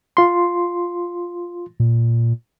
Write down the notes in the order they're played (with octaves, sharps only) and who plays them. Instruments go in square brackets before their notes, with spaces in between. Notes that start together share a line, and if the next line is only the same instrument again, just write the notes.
[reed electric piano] F4 C6
[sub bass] A#2